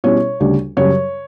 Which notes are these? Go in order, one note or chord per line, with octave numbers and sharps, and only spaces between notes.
B2 G3 C#4 E4 C#5
D2 C#3 G3 D4
F#2 C#3 G3 C#5